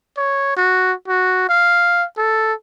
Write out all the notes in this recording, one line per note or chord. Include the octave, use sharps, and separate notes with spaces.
C#5
F#4
F#4
F5
A4